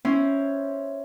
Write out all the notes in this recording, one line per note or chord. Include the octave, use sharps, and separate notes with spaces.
C#4 E4 C5